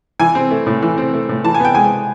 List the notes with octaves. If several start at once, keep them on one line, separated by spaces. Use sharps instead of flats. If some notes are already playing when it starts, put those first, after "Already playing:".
E3 G#5
C4
A3
A2
E3
C4
A3
A2
E3 A5
G#5
B3 G5
G#3 G#5